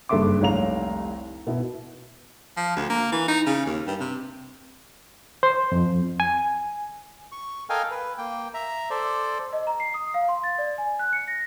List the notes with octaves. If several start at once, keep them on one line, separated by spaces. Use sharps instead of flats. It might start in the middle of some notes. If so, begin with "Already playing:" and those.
F#1 G2 A4 E5 C6 D6
F1 C2 C#5 F5 A#5 F7
B2 E4
F3
D2
A#3
E3
D#4
C#3
D#2
G2
C3
C5
F2
G#5
C#6
A4 A#4 D#5 F5 G5 G#5
B4
A#3 G5
E5 A#5
A4 C5 D5
D#5
A#5
C7
D#6
F5
C6
A6
D5
G#5
F#6
C#7
A#6